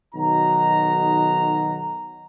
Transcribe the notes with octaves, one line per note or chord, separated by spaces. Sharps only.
B1 D#3 D#4 F#4 A#5